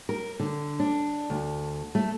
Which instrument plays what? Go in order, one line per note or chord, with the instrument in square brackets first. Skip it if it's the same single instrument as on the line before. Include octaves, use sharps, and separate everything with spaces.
[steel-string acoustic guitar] A#4
D3
D4
D2
A3